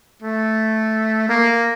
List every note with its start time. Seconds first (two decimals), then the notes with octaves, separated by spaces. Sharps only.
0.22 A3
1.29 A#3